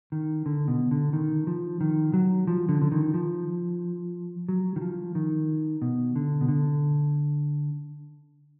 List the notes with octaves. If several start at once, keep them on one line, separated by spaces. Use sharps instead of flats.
D#3
D3
B2
D3
D#3
F3
D#3
F#3
F3
D3
D3
D#3
F3
F#3
D#3
F3
D#3
B2
D3
B2
D3